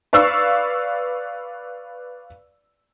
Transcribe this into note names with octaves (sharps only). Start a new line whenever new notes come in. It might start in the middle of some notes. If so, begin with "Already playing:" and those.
B4 D5 F5 C#6 E6